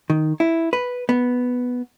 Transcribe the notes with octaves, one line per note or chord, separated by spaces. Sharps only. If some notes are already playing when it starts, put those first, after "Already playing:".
D#3
E4
B4
B3